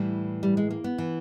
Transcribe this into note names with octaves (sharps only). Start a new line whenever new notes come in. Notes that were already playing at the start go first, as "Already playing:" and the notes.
Already playing: A2 E3 G3
G3
G#3
A#3
B3
E3